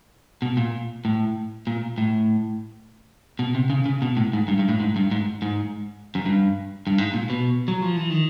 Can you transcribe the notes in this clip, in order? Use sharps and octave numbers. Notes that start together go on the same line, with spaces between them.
B2
A#2
A2
A#2
A2
B2
C3
C#3
C#3
B2
A2
G#2
G2
G2
A2
G#2
G2
G#2
G#2
F#2
G2
G2
G#2
A#2
B2
F#3
F3
E3
D#3